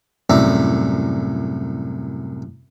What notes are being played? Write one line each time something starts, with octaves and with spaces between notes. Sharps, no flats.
C2 F#2 A2 D5 E5 A#5